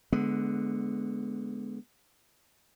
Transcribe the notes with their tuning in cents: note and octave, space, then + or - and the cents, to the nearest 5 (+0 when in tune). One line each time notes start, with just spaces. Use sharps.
D3 +0 G#3 +20 B3 +0